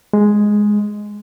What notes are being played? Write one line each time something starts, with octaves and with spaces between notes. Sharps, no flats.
G#3